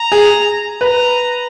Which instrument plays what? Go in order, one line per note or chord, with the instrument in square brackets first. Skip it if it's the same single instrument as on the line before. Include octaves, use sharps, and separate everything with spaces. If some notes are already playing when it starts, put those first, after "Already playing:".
Already playing: [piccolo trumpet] A#5
[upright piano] G#4
[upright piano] B4 [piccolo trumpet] A#5